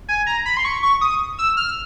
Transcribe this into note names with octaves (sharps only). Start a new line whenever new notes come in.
G#5
A#5
B5
C6
C#6
C#6
D#6
E6
F6